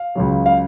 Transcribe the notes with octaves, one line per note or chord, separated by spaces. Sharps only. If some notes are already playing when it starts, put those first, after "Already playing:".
Already playing: F5
C#2 C#3 F#3
F5